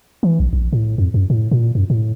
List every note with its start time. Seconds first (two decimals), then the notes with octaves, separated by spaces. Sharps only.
0.23 E3
0.40 A#1
0.53 A#1
0.73 A2
0.98 F2
1.14 F#2
1.30 A2
1.51 A#2
1.75 F#2
1.90 A2